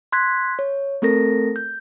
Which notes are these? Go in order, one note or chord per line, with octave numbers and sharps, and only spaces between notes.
C6 F#6 G#6 B6
C#5
A3 C4 A4 A#4 A#6
G6